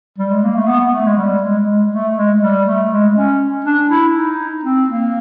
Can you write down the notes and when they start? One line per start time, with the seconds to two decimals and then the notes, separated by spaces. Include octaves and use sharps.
0.19 G3
0.31 G#3
0.43 A#3
0.56 A3
0.68 B3
0.80 B3
0.93 A3
1.05 G#3
1.17 G3
1.42 G#3
1.67 G#3
1.91 A3
2.17 G#3
2.41 G3
2.66 A3
2.90 G#3
3.15 C#4
3.65 D4
3.89 E4
4.14 D#4
4.64 C4
4.88 A#3